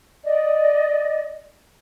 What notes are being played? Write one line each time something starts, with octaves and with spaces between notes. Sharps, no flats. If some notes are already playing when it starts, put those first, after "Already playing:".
D5 D#5